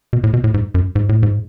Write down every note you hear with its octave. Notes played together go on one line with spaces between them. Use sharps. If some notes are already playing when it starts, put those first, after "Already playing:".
B2
A2
B2
A2
G#2
F#2
G#2
A2
G#2